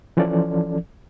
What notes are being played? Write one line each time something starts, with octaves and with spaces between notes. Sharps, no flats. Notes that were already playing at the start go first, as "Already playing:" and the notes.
E3 F3 C#4 A4 D5